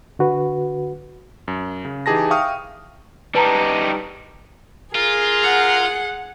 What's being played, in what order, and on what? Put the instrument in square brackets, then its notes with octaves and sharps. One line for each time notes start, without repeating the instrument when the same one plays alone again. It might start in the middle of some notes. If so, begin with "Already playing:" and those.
[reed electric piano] D3 F#4 B4
[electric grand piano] F#2
C#3
E3 D#4 G4 G#4 A5 A#6
E5 F5 G5 C#6 D#6 F6
[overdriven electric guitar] G3 D#4 [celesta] B4 A5 A#5
[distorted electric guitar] F4 [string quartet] G#4 [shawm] A#4
[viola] F#5